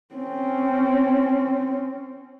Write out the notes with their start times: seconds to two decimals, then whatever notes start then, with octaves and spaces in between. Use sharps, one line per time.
0.15 C4 C#4